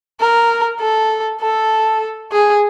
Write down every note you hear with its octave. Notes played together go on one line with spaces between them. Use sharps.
A#4
A4
A4
G#4